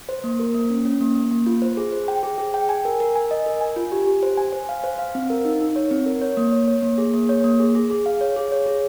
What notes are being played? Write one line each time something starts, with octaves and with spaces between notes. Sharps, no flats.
C5
A#3
A#4
A#3
C#4
C#4
A#3
A#3
A#3
F4
C5
G#4
C5
G5
G#4
G#4
G5
G#5
A#4
A#4
G#5
D#5
A#4
G#5
F4
G4
G4
C5
G#5
C5
F5
C5
F5
C4
A#4
D#4
D#4
C#5
C4
A#4
C#5
A#3
C#5
C#5
A#3
G#4
A#3
C#5
A#3
G#4
G#4
G#4
F5
C#5
G#4
C#5
G#4